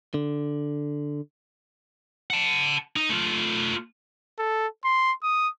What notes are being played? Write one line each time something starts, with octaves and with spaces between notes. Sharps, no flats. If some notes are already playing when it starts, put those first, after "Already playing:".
D3
F#5 A5
D#4
A3 F4
A4
C6
D#6